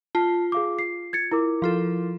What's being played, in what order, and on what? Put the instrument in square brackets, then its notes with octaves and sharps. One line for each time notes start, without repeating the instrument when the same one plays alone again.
[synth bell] F4 [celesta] A5
[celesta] G#4 F5 D6
C7
G#6 A6 C#7
E4 A#4 D6
[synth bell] F3 F4 A4